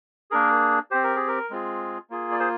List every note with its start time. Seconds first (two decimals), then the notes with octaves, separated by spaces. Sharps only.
0.31 A#3 D4 G#4 A#4
0.91 C4 G4 C5
1.04 A#4
1.16 G#4
1.28 A#4
1.50 G#3 C4 F4 G#4
2.10 A#3 F4 G#4
2.32 D5
2.40 G#4 C5